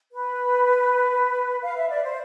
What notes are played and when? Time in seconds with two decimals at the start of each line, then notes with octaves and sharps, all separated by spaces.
0.12 B4
1.62 F5
1.76 E5
1.90 D5
2.04 C5